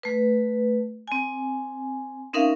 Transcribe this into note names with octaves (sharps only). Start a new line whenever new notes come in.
A3 B4
C4 G#5
C4 C#4 D#4 A#4 E5 F5